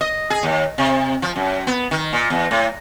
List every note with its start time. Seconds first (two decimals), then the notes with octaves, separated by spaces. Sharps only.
0.01 D#5
0.30 G#4
0.43 D#2
0.78 C3
1.22 F3
1.36 F#2
1.67 B3
1.91 D#3
2.13 A#2
2.30 E2
2.51 A2